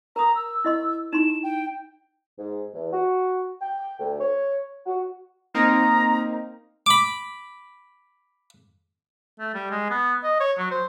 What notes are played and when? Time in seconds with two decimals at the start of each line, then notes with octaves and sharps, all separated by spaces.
0.16 A#4 A#5 D#6
0.36 E6
0.65 E4 D#5 C6
1.13 D#4 E4 C6 E7
1.43 G5
2.39 G#2
2.74 E2
2.93 F#4
3.61 G5
4.00 D2
4.20 C#5
4.86 F#4
5.55 A#3 C4 D#4 A#5
6.86 B5 D6
9.39 A3
9.54 G3
9.71 G#3
9.90 B3
10.23 D#5
10.40 C#5
10.58 F#3
10.71 C5